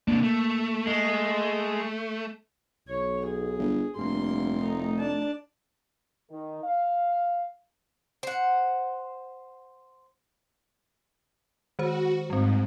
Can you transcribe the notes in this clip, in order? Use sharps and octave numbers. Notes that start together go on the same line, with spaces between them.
C3 A#3 D4
A3
G#3
B1 C#5
G#4
G1
F1 G2 A#3 C6
A3 D#4
D4 A5
D#3
F5
C5 F#5
D#3 G#3 F#4 C5
G#2 G3 C4